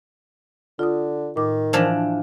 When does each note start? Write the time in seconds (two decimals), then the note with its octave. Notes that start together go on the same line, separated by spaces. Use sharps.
0.79 D3 F4 D5 D#6
1.36 A2 D#3 D6
1.73 E3 F3 D4 C5